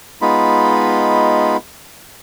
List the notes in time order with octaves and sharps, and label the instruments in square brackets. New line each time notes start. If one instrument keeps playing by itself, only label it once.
[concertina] G#3 B3 D#4 F4 B5